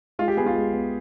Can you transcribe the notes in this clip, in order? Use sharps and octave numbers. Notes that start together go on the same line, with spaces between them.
G#3 F4
G4
B3 G#4
F4
G#3
B3